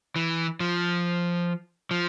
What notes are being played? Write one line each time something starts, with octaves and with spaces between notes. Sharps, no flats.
E3
F3
F3